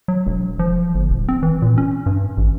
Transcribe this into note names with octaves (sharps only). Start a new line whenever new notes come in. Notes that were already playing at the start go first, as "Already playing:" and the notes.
F#3
E1
F3
G1
D#1
C4
E3
A#2
C#4
G2
A1